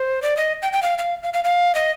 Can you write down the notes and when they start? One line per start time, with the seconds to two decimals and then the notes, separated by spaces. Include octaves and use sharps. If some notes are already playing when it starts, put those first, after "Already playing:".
Already playing: C5
0.22 D5
0.37 D#5
0.62 G5
0.73 G5
0.82 F5
0.98 F5
1.23 F5
1.34 F5
1.44 F5
1.75 D#5